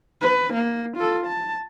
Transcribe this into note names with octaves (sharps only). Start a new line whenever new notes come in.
B4
A#3
F4 A4
A5